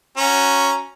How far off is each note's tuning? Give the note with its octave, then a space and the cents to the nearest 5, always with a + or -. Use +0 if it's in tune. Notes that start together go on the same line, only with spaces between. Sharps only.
C#4 +0 F#4 -5 A#5 +0